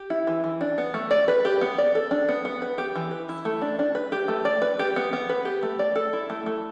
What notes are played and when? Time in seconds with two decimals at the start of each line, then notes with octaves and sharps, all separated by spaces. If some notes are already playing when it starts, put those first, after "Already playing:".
Already playing: G4
0.10 E4
0.27 E3
0.44 E3
0.61 D4
0.78 B3
0.94 A3
1.11 D5
1.28 B4
1.45 G4
1.61 B3
1.78 D5
1.95 A4
2.11 D4
2.29 B3
2.45 B3
2.62 B4
2.78 G4
2.95 E3
3.11 B4
3.29 E4
3.45 A3
3.62 D4
3.79 D4
3.95 B4
4.12 G4
4.28 A3
4.45 D5
4.62 B4
4.79 G4
4.96 B3
5.13 B3
5.29 B4
5.45 G4
5.63 A3
5.79 D5
5.95 A4
6.13 E4
6.30 A3
6.46 A3